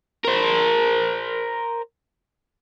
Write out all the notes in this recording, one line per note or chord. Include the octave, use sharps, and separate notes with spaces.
A#4 C5